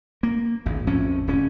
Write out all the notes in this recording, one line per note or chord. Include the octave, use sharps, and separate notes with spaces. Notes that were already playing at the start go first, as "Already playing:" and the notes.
A#3
G#1 D2
A#1 F2 A2 C#4
D1 C#4